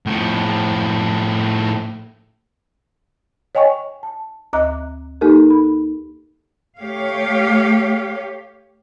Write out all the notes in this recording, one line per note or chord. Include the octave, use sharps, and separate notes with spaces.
A2 F3
C#5 D#5 G5 G#5 C#6
A5
D2 D#5 A#5 D6 F#6
A#3 D#4 G4 A4 A#4
B5
A3 G4 C#5 F5